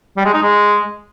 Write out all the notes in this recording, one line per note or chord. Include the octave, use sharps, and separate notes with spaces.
G3
G#3
D#4
G#3